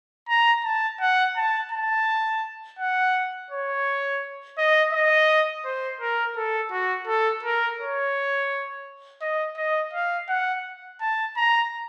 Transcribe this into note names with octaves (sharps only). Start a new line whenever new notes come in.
A#5
A5
F#5
A5
A5
F#5
C#5
D#5
D#5
C5
A#4
A4
F#4
A4
A#4
C#5
D#5
D#5
F5
F#5
A5
A#5